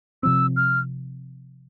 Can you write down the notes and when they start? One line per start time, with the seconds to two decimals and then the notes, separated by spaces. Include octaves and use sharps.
0.23 C3 F3 C4 E6
0.56 F6